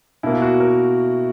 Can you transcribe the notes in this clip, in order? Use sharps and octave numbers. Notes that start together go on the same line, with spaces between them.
B2 A#3 E4
F#4
A#4